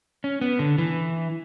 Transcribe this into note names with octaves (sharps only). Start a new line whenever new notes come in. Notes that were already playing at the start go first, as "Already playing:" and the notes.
C#4
B3
D3
E3